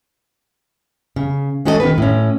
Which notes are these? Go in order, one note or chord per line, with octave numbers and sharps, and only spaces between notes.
C#3
G#3 C#4 F#4 A4 C#5 D#5
D#3 B3 B4
A2 C#4